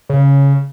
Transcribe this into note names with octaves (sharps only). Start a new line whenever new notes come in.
C#3